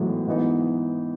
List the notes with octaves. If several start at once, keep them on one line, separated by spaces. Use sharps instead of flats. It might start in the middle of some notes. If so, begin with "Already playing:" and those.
Already playing: A1 G#2 E3 F#3 A3 B3 D#4
G#2 E3 B3 D#4